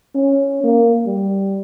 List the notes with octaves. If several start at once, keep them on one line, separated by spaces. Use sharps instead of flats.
C#4
A#3
G3